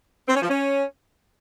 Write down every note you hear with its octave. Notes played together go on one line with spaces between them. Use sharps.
C4
C#4
F3
C#4